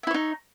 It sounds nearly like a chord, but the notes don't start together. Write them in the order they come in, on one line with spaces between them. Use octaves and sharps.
E5 E4 C#5 D#4